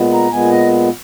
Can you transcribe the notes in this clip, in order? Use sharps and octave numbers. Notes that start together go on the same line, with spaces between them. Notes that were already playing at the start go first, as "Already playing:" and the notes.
Already playing: A#2 G#3 B3
A#5
A#2 G#3 B3 G#5
D#5